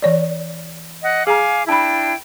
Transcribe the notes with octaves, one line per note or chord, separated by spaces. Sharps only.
E3 C#5 D5
D#5 F#5
G#4 F5 G#5 A#5 D6
D4 E4 G5 A5 B5